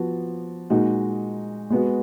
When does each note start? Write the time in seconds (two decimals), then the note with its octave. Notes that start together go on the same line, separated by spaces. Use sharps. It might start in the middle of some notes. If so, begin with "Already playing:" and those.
Already playing: F3 B3 F#4
0.70 A#2 G#3 D#4 F#4
1.70 G#3 B3 F#4